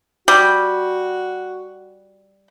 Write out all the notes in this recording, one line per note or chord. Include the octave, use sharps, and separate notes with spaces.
G3 F#4